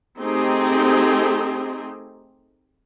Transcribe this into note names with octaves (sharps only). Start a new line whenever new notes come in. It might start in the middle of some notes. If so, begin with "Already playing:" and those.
A3 C4 D#4 G4 G#4